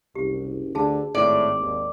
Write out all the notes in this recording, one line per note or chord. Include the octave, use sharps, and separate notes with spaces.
F#1 C2 G4
D2 D3 G#4 A5
G#1 A2 D5
D#2